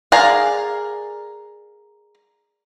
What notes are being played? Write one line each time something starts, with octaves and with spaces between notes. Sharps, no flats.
G#4 A#4 D5 F5